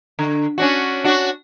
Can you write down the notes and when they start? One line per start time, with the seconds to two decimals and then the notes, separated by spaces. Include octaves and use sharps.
0.19 D3
0.58 C#4 D4 F#4
1.04 D4 F#4